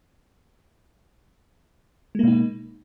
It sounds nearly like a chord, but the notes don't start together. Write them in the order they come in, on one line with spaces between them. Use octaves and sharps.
G#3 A#3 B2 D#4